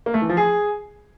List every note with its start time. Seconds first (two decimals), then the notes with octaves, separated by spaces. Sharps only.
0.06 A#3
0.14 A3
0.22 E3
0.29 F3
0.37 G#4